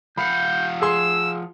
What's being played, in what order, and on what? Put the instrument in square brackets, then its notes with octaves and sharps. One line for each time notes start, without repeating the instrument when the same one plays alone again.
[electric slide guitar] F3 F5 F#5 [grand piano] B5 [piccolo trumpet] G6
[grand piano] G#4 C6 [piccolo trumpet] E6